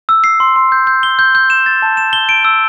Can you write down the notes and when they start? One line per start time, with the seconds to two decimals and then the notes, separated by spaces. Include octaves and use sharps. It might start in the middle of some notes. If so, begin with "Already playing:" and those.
0.09 E6
0.24 C7
0.40 C6
0.56 C6
0.72 G6
0.87 G6
1.03 G7
1.19 G6
1.35 G6
1.50 E7
1.66 A6
1.82 A5
1.97 E7
2.13 G7
2.29 D7
2.45 E6